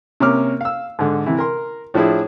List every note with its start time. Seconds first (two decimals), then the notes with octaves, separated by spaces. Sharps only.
0.20 C3 A#3 C#4 D6 F6
0.61 F5 E6
0.99 G#2 D3
1.26 C3 E3 E4
1.38 A#4 C6
1.94 A2 F3 D4 E4 G#4